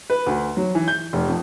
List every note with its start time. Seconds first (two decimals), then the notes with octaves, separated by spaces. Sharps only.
0.10 B4
0.26 D2
0.57 F#3
0.75 E3
0.88 G6
1.13 F1
1.28 F2